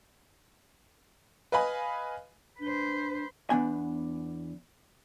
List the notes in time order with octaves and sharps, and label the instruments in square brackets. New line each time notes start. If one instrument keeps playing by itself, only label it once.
[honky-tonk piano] B4 D#5 F5 G#5 B5
[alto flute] D4 [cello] B4 C5
[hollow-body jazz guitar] E2 B3 D4 G#5